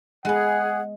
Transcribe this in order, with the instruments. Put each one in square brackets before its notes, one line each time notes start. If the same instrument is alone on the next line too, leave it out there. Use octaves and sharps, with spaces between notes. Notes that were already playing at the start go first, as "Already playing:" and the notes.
[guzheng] G#3 B3 [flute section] G#4 [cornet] F#5